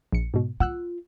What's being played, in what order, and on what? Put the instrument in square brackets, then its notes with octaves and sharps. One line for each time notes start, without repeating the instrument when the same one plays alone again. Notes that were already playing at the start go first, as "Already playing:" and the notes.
[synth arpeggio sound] A#1 C#7
G#2 B2
[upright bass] F4 [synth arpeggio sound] F#5 E6 F#6